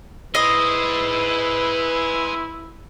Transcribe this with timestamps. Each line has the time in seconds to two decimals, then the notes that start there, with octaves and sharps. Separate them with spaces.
0.35 E4 G#4 B4 C5 D#5